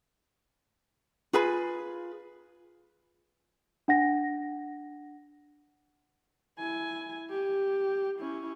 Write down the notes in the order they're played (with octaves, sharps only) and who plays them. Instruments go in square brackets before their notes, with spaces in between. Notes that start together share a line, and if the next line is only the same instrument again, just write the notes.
[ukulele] F4 G#4 B4 B5
[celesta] D4 F#5 A#6
[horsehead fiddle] E4 G#5
G4
C#4 E4